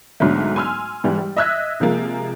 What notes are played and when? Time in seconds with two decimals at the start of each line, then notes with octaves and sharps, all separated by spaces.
0.20 B1 G#2 D3 F#3 A3
0.56 G#5 C6 E6 F6
1.04 G#2 E3 G3
1.18 G3
1.36 D#5 E5 E6 F#6 G#6 B6
1.80 C3 F3 G#3 A#3